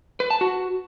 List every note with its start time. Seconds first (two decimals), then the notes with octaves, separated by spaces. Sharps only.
0.20 B4
0.31 A5
0.41 F#4